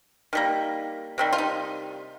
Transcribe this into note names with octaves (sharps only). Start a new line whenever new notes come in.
D#3 G3 A#3
C3 D#3 G3
F4
D#4